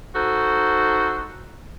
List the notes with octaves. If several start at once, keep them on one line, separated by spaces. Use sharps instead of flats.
D#4 F#4 A4 C5